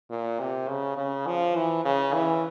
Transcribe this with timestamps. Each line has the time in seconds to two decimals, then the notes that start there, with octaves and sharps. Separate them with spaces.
0.10 A#2
0.40 C3
0.69 C#3
0.97 C#3
1.27 F3
1.56 E3
1.85 C#3
2.14 E3